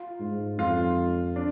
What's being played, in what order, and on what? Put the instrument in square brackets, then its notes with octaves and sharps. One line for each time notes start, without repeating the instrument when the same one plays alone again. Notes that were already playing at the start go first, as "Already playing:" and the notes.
Already playing: [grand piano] F4
[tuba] G#2
[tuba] F2 [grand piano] F4
[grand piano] D4